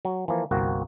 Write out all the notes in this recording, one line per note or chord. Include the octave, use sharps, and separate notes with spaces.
F#3
E3 F3 A#3
G1 C2 A#3 C4 F#4